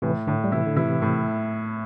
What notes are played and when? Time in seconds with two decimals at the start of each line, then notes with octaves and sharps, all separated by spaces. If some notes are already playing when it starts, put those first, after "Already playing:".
0.02 A2 C3 E3
0.27 A2 D3
0.44 G3
0.52 C3 E3 E4
0.67 D3
0.76 C3 E3 E4
1.02 A2